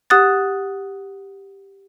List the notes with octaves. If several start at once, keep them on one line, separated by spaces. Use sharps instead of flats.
G4 F#5 D#6 F#6 A6